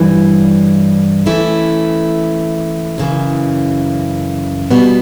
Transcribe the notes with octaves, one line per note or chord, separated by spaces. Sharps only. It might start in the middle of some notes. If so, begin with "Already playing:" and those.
Already playing: G2 E3 G3
E3 A3 C#4 E4
F#2 C#3 E3
B2 G3 B3